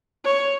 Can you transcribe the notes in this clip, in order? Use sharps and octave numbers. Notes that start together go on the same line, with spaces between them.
C#5